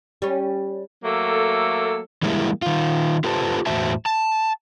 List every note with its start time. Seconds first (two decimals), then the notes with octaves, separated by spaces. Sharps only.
0.22 G3 C#4
1.04 F#3 A3 A#3 A4
2.23 E3 G3 G#3 A#3 D4 E4
2.62 D#3 F4
3.24 F4 G4 A4 B4 C5 A5
3.66 E2 A2 F#4 C5 E5 A5
4.06 A5